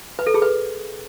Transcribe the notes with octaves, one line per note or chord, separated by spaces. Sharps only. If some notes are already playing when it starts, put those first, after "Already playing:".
B4
A4
G#4
B4